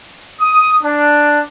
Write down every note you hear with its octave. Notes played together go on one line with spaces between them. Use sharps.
D#6
D4